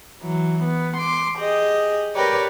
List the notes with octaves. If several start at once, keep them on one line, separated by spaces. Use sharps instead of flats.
E3 F#3
B3
C6 D6
G4 G#4 D#5
G4 A#4 B4 C#5 D5 G5